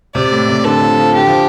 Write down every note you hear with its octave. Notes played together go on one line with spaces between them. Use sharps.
C3 D5
A2
C3
D3 A4
F3
F3
D3 G4
F3